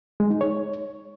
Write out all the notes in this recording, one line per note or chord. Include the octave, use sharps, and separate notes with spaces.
G#3
D#4
C#5